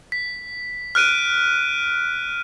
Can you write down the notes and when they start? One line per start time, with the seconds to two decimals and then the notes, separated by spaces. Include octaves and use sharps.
0.12 B6
0.95 F6 F#6 D7 D#7